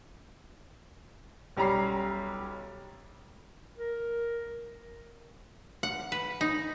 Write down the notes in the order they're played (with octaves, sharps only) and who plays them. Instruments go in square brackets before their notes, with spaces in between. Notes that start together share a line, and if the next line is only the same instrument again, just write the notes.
[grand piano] B1 G3 C#4 A#5 B5 C7
[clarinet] A#4
[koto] F#5
B4
D#4